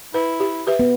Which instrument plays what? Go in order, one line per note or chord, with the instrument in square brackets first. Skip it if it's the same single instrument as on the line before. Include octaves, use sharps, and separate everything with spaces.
[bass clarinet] E4 [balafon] B4
[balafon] G4
G4 B4 E5
[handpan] B3